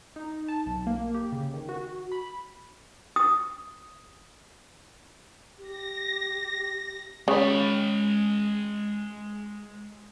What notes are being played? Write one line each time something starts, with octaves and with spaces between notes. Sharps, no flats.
D#4
A5
B1
A#3
G4
C#3
D#3
F#4
B5
D#6
G4 A#6
C#3 G#3 B5